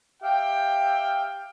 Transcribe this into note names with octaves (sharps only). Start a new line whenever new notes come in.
G4 E5 F5 G5